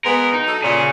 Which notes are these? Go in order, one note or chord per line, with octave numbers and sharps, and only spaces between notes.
G#3 B3 A#4
D#4
F#3 A4
A#2 G#4 C#5